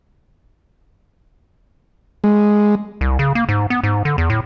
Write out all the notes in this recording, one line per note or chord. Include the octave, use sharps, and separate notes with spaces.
G#3
C2
C#3
A#3
G#2
B3
G#2
D3
E2
A2